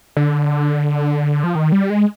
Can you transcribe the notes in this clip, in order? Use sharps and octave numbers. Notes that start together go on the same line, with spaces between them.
D3
F3
D#3
G3
G#3